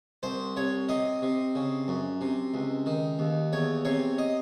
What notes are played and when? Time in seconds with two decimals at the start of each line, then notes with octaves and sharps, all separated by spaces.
0.23 C2 C5
0.56 C2 C#5
0.89 C3 D#5
1.22 C3
1.55 C#3
1.88 F#2
2.21 C3
2.54 C#2
2.86 D#3
3.19 D#2
3.53 E2 C#5
3.85 C3 C#5
4.18 D#5